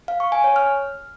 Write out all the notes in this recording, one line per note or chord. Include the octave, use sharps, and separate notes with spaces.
F5
C#6
G#5
C#5
F6